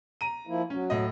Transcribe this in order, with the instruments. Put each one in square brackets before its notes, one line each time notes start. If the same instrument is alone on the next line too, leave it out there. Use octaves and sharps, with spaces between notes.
[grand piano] A#5 D#7
[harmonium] F3 A#3 E4
[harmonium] F#3 [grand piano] C#4
[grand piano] A2 D#5